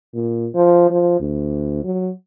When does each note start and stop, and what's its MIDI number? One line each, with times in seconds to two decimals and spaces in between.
0.14 0.47 46
0.54 0.89 53
0.90 1.20 53
1.20 1.83 38
1.85 2.11 54